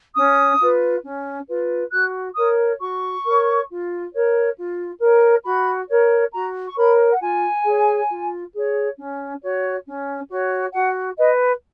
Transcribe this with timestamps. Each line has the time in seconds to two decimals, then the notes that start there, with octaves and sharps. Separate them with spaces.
0.15 C#4 D#6
0.60 F4 B4
1.03 C#4
1.47 F4 B4
1.91 F#4 F#6
2.35 A#4 C#5 D#6
2.80 F#4 C#6
3.24 A#4 C#5
3.68 F4
4.12 A#4 C#5
4.55 F4
5.00 A#4 C#5
5.44 F#4 B5
5.88 A#4 C#5
6.32 F#4 A#5
6.65 C#6
6.76 A#4 C#5 B5
7.10 F#5
7.19 F4 G#5
7.64 G#4 C#5
8.08 F4
8.52 G#4 C#5
8.97 C#4
9.41 F#4 C#5
9.85 C#4
10.28 F#4 C#5
10.72 F#4 F#5
11.16 B4 D#5